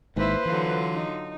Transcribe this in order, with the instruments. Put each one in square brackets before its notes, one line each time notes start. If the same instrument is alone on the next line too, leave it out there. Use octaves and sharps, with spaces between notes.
[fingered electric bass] G#1 G#2 D#3 [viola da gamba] A#3 E4 [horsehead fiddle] B4 C5
[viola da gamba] D3 F#3 F4 [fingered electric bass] E3
[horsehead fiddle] D#4